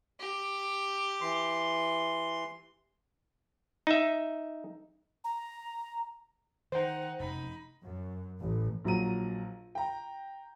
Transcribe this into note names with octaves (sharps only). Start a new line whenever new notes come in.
G4
E3 C6
D#4 E5
A#5
D#3 D#4 C5 F#5 G5
F1 F#2 D#4 B5
F#2
A1
A#1 F#3 A#5 D#7
G5 A#5